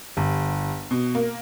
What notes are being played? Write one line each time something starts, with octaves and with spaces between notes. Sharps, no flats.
G1
B2
A#3